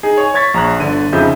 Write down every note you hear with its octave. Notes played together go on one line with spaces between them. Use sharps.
D#4 G#4
C#5 G#5
C#5 C#6 G#6 A6 B6
A#1 A#5 C#6 F#6
G1 D3 D#7
F2 C#3 F3 D#4 E5 G6